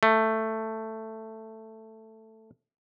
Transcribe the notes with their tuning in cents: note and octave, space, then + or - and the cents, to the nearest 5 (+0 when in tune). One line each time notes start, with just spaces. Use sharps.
A3 +10